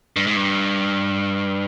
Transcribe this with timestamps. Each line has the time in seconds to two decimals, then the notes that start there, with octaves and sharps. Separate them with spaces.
0.16 G2
0.27 G#2
0.36 G2